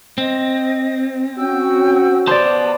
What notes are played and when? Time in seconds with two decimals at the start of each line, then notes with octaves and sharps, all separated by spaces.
0.18 C4 D#5
1.37 C#4 F#4 G5 E6
2.27 B3 C5 D5 A5 D6